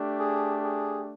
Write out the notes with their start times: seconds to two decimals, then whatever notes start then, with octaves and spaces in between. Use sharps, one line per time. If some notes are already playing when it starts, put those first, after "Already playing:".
Already playing: A3 D4 G4
0.20 G#4
0.64 G#4